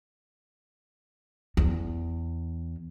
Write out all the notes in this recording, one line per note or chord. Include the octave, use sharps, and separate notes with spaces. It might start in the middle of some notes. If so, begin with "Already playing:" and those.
E2